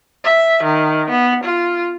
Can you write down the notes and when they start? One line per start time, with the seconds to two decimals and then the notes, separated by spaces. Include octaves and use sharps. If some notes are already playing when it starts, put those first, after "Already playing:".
0.24 E5
0.63 D#3
1.10 B3
1.44 F4